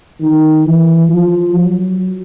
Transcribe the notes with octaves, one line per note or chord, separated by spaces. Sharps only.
D#3
E3
F3
F#3